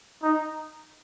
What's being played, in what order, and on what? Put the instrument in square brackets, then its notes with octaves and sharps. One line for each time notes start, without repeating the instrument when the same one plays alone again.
[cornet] D#4